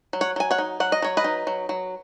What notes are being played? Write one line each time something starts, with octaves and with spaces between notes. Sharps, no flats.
F#3
C#5 F#5
F#3 G#5
C#5 F#5
D#4
F#3 F#5
D#5
F#3 C#5
B4 D#5
D#4
F#3
F#3